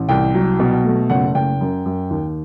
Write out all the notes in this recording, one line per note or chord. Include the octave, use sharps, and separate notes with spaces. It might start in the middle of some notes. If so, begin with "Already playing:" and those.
Already playing: A1
C2 G5
F#3
B2
A3
F#1 F#5
F#1 G5
F#2
F#2
D#2